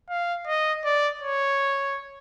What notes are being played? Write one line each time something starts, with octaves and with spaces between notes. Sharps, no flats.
F5
D#5
D5
C#5